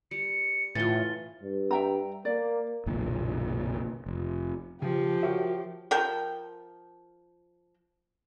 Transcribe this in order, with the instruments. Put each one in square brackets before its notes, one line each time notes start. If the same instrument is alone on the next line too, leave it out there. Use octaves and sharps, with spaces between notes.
[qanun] G3 [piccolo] C#7
[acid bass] A2 [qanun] E3 F4 [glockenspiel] A6 G7
[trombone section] G2
[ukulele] E5 G5 A#5
[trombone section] A#3 A#4 [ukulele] D5
[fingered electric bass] F#1 B1 A#2 D#3
F1
[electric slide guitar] C#3 [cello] F3 [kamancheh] G4
[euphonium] F#4 [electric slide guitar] A#4 C#5 E5
[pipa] F3 A#4 G5